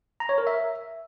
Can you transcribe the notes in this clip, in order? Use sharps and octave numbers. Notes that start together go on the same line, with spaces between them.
A#5
C#5
A#4
E5